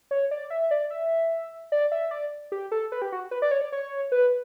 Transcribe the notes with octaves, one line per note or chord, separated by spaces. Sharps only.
C#5
D5
E5
D5
E5
D5
E5
D5
G4
A4
B4
G4
F#4
B4
D5
C#5
D5
C#5
B4